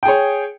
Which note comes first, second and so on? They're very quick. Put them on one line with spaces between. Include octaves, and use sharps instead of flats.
G5 G#4 C#5